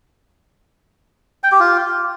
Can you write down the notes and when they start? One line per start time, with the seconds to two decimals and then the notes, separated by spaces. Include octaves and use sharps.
1.44 G5
1.52 G4
1.60 F4